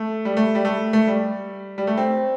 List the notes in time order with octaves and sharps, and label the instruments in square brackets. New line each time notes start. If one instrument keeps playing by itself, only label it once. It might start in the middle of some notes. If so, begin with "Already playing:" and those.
Already playing: [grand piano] A3
G3
A3
G3
A3
A3
G3
G3
A3
C4